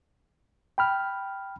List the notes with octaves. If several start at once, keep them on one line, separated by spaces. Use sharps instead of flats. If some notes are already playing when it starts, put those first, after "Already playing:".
G5 B5 F6